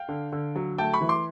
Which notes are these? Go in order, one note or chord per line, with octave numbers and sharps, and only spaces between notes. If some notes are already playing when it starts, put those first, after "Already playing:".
Already playing: F5 G5
D3
D3
F#3
A3 G5 A5
B5 C#6
E3
C6 D6